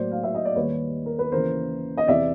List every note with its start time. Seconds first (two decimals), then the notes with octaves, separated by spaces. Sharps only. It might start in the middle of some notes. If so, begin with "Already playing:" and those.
Already playing: A2 F#3 A#3 C5 D5
0.12 F5
0.24 E5
0.35 D#5
0.45 D5
0.56 D#2 D#3 G3 A#3 B4 C#5
1.06 A#4
1.19 B4
1.32 D#2 C#3 E3 A#4 C5
1.98 D#5
2.07 E2 C3 E3 D5 E5